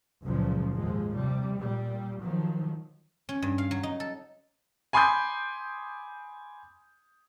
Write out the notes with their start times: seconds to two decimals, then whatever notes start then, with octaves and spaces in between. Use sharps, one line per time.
0.22 F#1 C#2 F#2 A#2 C#3 F3
0.73 D#2 G#2 F3 G#3
1.15 C3 G3
1.58 A#2 G3
2.22 D#3 F3 F#3
3.29 C#4
3.42 G2
3.58 F5
3.71 F#3
3.83 D#4
4.00 A4
4.93 G#5 B5 C6 D6 D#6 G6